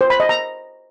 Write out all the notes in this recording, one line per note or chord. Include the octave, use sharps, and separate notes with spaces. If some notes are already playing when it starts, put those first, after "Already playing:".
C5
B5
D#5
A#5